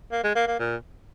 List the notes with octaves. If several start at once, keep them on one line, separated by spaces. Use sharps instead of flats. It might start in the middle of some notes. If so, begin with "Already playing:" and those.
A#3
G#3
A#3
A#3
A#2